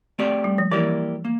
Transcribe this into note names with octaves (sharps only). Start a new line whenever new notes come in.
A3 C4 G4 D5
G3
F3
E3 A#3 E4 G4 A#4 D5
A#3